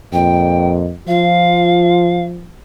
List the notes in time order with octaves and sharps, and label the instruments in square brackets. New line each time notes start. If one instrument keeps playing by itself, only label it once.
[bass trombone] F2 [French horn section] A#2 D#5 [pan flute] G5
[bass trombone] F3 [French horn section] F4 [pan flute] F5